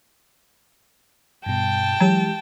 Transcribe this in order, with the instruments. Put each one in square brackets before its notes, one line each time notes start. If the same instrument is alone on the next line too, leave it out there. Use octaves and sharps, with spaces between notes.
[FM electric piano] G2 B2 [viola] G5 A5
[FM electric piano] E3 G#3 G4 [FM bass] F#3